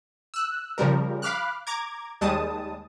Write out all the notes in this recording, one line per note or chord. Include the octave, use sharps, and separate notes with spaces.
E6 F#6
C#3 F3 G3 A#4
F5 B5 D6 F6 F#6
A#5 D6 G#6
D#2 G3 G#3 A5 D#6